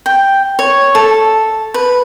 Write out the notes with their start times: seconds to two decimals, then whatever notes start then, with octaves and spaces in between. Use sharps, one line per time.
0.06 G5
0.59 C#5
0.95 A4
1.74 B4